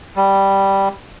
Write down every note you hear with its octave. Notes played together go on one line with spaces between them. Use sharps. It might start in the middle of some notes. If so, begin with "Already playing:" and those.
G3